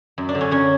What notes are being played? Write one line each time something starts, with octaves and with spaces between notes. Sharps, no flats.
F#2
D4
D3
C#4
F#2 C#4